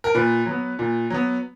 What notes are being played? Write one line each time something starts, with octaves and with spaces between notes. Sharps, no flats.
A#4
A#2 B4
F#3 B3
A#2
F#3 B3